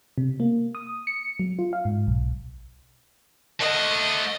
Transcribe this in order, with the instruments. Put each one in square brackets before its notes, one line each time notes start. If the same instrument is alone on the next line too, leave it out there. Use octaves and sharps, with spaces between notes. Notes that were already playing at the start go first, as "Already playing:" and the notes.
[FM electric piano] C3
A#3
D#6
C#7
F#3
F4
F5
G#2
B1
[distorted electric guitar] A3 F#5 [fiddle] D#5